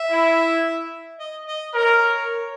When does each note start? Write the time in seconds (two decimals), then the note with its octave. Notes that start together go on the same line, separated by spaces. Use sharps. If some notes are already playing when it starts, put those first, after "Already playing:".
Already playing: E5
0.10 E4
1.19 D#5
1.47 D#5
1.74 A#4 C#5